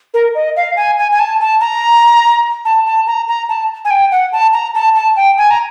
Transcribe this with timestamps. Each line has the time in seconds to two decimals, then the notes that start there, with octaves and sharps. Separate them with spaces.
0.14 A#4
0.35 D#5
0.56 F5
0.77 G#5
0.98 G#5
1.12 G#5
1.20 A5
1.40 A5
1.61 A#5
2.65 A5
2.86 A5
3.07 A#5
3.28 A#5
3.49 A5
3.85 G#5
3.91 G5
4.12 F#5
4.32 A5
4.53 A#5
4.75 A5
4.95 A5
5.16 G5
5.38 G#5
5.51 A#5